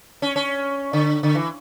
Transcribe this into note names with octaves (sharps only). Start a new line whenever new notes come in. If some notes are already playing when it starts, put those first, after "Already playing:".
C#4
C#4
D3
D3
E3